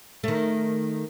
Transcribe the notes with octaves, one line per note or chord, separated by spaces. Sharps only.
D#3 A3